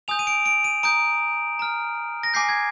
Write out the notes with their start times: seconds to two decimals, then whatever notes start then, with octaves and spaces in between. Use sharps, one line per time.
0.08 G#5 D#6 G6 F7
0.19 D#7
0.27 D7
0.46 D7
0.64 D#7
0.83 A#5 D#6 G6 D7
1.59 A#5 F6
2.23 A#6
2.34 G#5 D6 G6 C7
2.49 G#6